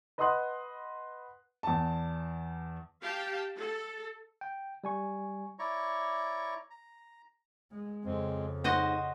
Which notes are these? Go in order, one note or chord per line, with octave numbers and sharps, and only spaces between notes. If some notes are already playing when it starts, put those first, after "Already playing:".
B4 D#5 F#5 C6 D#6 F#6
E2 A5
G4 F5 G5 A5
A4
G5
G3 G#5 C#6
E4 C#5 D5 A#5 C#6
A#5
G#3
F2 C#3 G#3 C4
G#2 F#4 C5 D#5